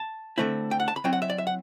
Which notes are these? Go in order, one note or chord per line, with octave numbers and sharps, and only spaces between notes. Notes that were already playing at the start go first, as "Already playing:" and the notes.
Already playing: A5
D3 A3 C4 E4
G5
F#5
A5
B5
F#3 C4 E4 G5
F#5
E5
D5
E5
F#5